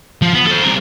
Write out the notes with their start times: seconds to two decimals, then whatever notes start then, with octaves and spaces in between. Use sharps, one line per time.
0.22 F3
0.34 B3
0.47 A4 C5
0.63 C2 A#4